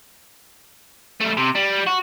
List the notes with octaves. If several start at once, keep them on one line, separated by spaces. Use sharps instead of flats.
G3 A3
C3
G3
F#4